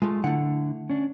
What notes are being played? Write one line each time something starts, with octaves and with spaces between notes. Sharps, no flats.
G#3 A3 F4 A5
D3 A3 E4 F#5
C#4 D4